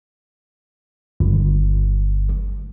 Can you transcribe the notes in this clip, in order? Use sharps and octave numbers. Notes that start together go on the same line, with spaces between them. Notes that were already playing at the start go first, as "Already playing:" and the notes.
G1